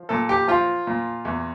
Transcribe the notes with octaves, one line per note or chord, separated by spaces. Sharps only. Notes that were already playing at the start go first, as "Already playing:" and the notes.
Already playing: F3
A#2 A4
G4
F3 F4
A#2
E2